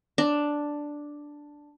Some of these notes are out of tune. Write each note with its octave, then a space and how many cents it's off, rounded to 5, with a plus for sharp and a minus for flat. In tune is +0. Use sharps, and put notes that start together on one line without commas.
D4 +0